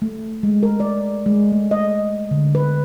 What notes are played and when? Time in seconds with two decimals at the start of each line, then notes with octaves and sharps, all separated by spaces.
0.02 A3
0.43 G#3
0.63 A#4
0.80 D5
1.26 G#3
1.52 A3
1.71 D#5
2.31 D3
2.55 B4